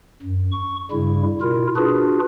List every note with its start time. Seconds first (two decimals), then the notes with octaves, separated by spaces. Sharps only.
0.22 F#2
0.52 C#6
0.91 G2 C#3 G3 E4
1.41 B2 E4 F4 A#4
1.76 D4 F4 F#4 G#4 B4